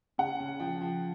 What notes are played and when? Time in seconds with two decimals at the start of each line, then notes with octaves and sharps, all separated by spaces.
0.18 C#3 F#5
0.40 C#3
0.60 F3 G5
0.81 F3